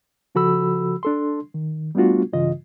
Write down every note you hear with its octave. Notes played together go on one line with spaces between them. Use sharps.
C#3 F3 F#4 A4 B5 E6
D4 A4 C6
D#3
G3 A3 B3 D4 F4 F#4
G2 C#3 E3 F4 D#5